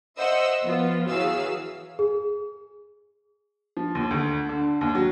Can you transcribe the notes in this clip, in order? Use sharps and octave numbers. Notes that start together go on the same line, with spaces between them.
C5 D#5 E5 F#5 E6
F3 B3 F4
E3 F#3 G#4 F5 E6
G#4
F3
D#2
D2
D3
D#2
F#3